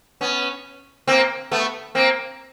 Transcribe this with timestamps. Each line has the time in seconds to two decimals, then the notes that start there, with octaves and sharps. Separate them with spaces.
0.21 B3 C#4
1.07 A#3 C4
1.51 A3 B3
1.95 A#3 C4